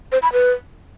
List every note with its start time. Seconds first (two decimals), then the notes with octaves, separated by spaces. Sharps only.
0.12 C5
0.22 B5
0.33 B4